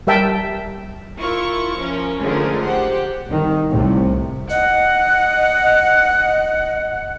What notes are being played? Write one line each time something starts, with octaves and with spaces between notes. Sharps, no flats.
G3 A#4 E5 G5 A5
E4 F4 A#4 C#6
F3 C#4 A#4
D3 F3 G#3 A3 C#4 A#4
G4 C5 F#5
C2 D#3
C2 A2 C3
D#5 F#5